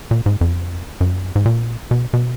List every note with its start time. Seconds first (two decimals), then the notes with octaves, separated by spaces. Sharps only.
0.11 A#2
0.26 G#2
0.41 F2
1.01 F#2
1.35 G#2
1.45 A#2
1.91 B2
2.13 B2